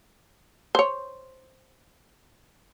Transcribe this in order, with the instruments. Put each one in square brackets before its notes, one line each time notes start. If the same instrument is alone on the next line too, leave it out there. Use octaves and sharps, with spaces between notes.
[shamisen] C5 C#5